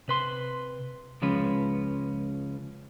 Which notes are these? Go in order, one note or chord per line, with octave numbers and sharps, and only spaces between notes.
C3 B4 C6
C#2 F3 G#3 C#4 B4